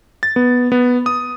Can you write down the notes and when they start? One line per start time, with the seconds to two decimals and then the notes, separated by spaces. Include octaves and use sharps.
0.23 A6
0.36 B3
0.72 B3
1.06 D#6